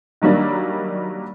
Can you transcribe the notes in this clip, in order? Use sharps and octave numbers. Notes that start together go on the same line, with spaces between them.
D#3 F#3 G3 A#3 D4